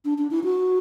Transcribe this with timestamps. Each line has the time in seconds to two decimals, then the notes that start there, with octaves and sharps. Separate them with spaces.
0.05 D4
0.18 D4
0.31 E4
0.44 F#4